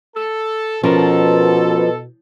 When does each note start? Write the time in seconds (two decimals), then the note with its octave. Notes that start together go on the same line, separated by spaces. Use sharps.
0.15 A4
0.83 B2 F3 C#4 A4 A#4